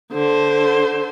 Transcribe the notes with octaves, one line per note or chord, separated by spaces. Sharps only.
D3 C5